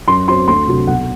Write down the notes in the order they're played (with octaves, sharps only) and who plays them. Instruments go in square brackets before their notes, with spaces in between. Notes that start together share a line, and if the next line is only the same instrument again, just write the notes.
[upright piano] F#2 C6
F#3 C4 C6
D2 C6
C3 F#3
B1 F#5